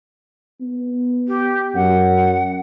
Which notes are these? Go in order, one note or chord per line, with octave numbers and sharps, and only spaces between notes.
B3
G4
F#2 F#5